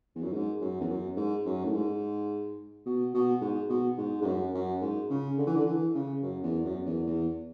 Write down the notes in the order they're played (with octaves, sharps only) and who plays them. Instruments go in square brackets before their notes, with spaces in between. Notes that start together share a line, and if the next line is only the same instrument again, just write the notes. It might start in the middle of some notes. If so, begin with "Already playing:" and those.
[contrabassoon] E2
F#2
G#2
F#2
E2
F#2
G#2
F#2
A2
G#2
B2
B2
G#2
B2
G#2
G#2
F#2
F#2
G#2
C#3
D3
E3
D3
E3
C#3
F#2
E2
F#2
E2
E2